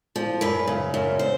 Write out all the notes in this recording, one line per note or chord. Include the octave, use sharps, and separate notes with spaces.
F3
F#2 B4
C#3
F#2
C5